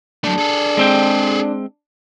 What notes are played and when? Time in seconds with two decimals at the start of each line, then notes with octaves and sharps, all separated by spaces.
0.24 F#3 A3 D4
0.38 G#4 A4
0.77 G#3 C4 G5